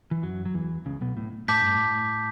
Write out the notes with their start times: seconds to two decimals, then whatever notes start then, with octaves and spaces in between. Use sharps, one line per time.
0.11 E3
0.23 F#2 F#3
0.45 F#3
0.54 E2 E3
0.86 C#2 C#3
1.01 B1 B2
1.17 A2
1.48 A2 A5 D6 G6 B6
1.62 G2
1.75 A2